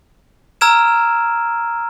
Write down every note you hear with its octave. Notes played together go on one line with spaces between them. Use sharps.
A#5 E6 F6 G#6 D7 E7